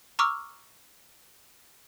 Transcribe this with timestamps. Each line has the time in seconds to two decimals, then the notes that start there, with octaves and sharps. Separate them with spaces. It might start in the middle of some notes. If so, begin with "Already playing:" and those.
0.19 A#5 C#6 D6 E6 F6